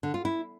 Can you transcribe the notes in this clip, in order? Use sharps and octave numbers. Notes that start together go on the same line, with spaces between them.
D3
F4
E4